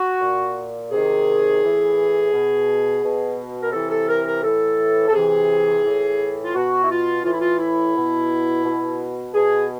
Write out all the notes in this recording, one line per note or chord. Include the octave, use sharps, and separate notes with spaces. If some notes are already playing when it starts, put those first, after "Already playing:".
Already playing: F#4
A#2
C3 D#3 G#4
A2 E3
B2
B2
A#4
C3 E3 A4
A4
A#4
A#4
A2 E3 A4
A4
C3 E3 G#4
A2 E3
F4
B2 F#4
E4
F4
A2 E3 F4
E4
F4
E4
B2
B2
B2 G#4